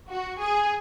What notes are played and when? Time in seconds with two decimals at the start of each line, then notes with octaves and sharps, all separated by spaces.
0.09 F#4
0.39 G#4